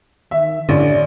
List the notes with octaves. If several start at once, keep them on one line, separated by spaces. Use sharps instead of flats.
D#3 E5
A1 D3 D5